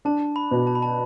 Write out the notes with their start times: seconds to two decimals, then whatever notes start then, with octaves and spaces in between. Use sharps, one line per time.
0.05 D4 A5
0.36 B5
0.51 B2
0.67 A5
0.75 B5
0.82 A5